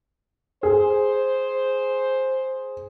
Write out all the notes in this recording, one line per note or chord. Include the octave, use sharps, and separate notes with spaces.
G#4 C5